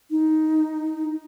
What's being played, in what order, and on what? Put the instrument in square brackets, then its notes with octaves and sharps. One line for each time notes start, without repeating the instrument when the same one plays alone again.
[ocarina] D#4